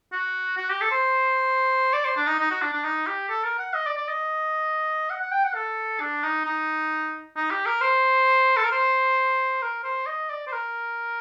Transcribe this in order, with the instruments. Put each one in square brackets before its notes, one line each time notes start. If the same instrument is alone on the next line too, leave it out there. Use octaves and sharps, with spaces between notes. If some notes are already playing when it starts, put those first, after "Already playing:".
[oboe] F#4
F#4
G4
A4
C5
D5
C5
D4
D#4
D#4
F#4
D4
D4
D#4
G4
A4
A#4
F#5
D#5
D5
D5
D#5
F#5
F#5
G5
F#5
A4
D4
D#4
D#4
D#4
G4
A#4
C5
A4
A#4
C5
A#4
C5
D#5
D5
C5
A#4